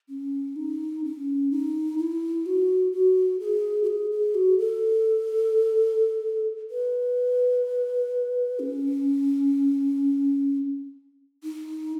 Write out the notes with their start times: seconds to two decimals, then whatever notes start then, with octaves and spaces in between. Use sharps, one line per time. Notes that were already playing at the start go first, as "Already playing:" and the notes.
0.09 C#4
0.56 D#4
1.04 C#4
1.51 D#4
1.98 E4
2.46 F#4
2.92 F#4
3.39 G#4
3.83 F#4
3.87 G#4
4.11 G#4
4.34 F#4
4.58 A4
6.70 B4
8.59 C#4
11.44 D#4